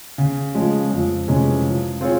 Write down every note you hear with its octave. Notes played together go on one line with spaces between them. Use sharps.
C#3
F3 G#3 C#4
F2
C3 E3 G#3 C#4
F3
C4 F4 G#4 C#5